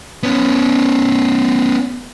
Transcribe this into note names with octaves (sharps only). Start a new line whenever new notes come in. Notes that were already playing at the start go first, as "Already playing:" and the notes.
B3 C#4